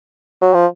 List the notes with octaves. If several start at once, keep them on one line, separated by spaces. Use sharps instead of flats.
F#3
F3